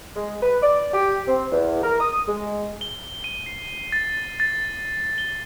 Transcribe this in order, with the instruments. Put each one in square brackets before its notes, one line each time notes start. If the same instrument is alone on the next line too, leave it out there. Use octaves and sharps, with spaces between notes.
[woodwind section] G#3
B4
D5
G4
C4
E2
A#4
D#6
G#3
[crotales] G7
D#7
C7
A6
A6
G7